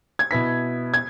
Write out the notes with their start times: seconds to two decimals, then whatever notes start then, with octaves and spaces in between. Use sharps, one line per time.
0.19 G#6
0.31 B2 B3 E4 B6
0.94 G#6